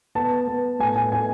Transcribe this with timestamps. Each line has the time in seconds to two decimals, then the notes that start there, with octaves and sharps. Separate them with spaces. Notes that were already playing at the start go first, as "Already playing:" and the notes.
0.15 B3 A5
0.48 B3
0.80 A2 G#5
0.96 G#5
1.12 A2 G#5